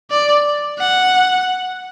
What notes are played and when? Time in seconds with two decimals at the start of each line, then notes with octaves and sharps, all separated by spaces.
0.11 D5
0.79 F#5